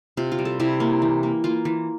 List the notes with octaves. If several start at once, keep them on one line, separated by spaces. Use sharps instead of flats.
C3 F4
F4
G3
A4
C3 E4
A#3
E3
A#3
A#3 F4
E3